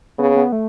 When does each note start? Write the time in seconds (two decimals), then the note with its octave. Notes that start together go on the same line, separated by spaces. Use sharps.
0.19 C#3 B3
0.36 B3
0.52 A3